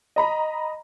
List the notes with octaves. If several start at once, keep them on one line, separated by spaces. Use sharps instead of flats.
D#5 A#5 B5